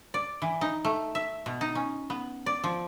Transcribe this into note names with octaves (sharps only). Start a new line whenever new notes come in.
D5
E3
D#4
A3
E5
B2
D#4
C#4
B3
D5
F3